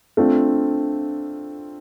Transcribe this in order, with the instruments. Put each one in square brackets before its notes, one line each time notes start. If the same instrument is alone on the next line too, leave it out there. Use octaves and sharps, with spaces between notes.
[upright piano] A3 D4 F4 [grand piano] C4